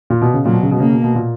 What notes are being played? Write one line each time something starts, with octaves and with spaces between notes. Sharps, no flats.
A#2
B2
C#3
A#2 F#3
B2
C#3
B2
C#3 A#3
B2
B2
A#2